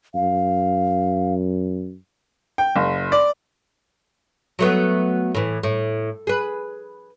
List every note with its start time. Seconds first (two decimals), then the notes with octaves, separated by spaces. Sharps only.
0.15 F#2 F5
2.58 G5
2.76 F#1
3.12 D5
4.59 F#3 A3 B3
5.35 A2 E3
5.63 A2
6.27 G#4 B4